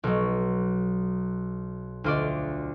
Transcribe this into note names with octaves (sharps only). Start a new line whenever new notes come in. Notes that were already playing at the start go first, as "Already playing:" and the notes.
B1 F#3
D2 F4 D5